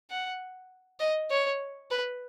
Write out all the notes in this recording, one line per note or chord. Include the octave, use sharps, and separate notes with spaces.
F#5
D#5
C#5
B4